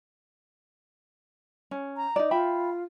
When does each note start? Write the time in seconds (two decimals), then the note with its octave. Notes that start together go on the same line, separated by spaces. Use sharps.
1.71 C#4
1.97 A#5
2.16 D#4 D5
2.31 F4 E5 G5 B5